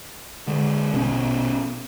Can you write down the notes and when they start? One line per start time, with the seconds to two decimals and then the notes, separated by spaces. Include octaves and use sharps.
0.47 D3 G#3
0.92 A#1 B2 C#4